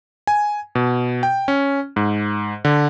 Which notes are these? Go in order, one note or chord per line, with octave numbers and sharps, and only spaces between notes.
G#5
B2
G5
C#4
G#2
D3